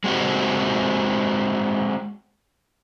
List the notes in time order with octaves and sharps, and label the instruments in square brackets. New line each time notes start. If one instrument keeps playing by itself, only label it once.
[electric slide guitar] G#3 A#3 C4 F#4 G4